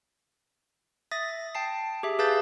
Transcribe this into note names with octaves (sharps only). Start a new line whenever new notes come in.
E5 D#6 A6 A#6
G5 A5 C7
G4 G#4 E5
G#4 B4 F5 A5 G6 A6